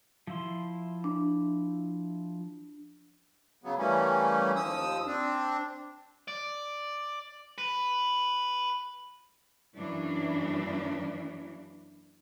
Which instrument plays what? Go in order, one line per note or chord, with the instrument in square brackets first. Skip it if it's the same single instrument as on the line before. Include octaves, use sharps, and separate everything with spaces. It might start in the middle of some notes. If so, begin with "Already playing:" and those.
[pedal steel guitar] F3 E4 C6
[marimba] D4
[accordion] C#3 F#3 B3
E3 G3 A3 A#3 C#4
D#2 F3 D#6 E6
C4 D4
[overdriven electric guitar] D5
B4
[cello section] F#2 E3 A#3 D4